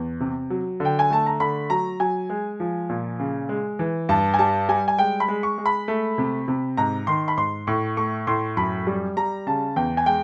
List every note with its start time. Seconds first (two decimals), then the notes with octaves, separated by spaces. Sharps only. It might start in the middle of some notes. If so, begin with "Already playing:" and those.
Already playing: E2
0.20 C3
0.50 F#3
0.80 D3
0.85 G5
0.99 G#5
1.10 A3 A5
1.26 A#5
1.40 D3 B5
1.70 F#3 A#5
2.00 F#3 G#5
2.30 G#3
2.60 F3
2.89 A#2
3.20 C#3
3.49 G#3
3.79 E3
4.09 G2 A5
4.34 G#5
4.39 G3 A5
4.69 G3 G#5
4.88 G#5
4.99 G#3 G5
5.20 B5
5.28 G#3
5.43 C#6
5.58 G#3
5.66 B5
5.88 A3
6.18 C3
6.48 C3
6.77 G#2 A#5
7.07 D#3 C6
7.28 B5
7.37 G#2 C6
7.67 A2 C#6
7.97 A3 C#6
8.27 A2 C6
8.57 F#2 B5
8.87 G3
9.17 G3 A#5
9.47 C#3 A5
9.76 E2 G5
9.97 G#5
10.06 G#3 G5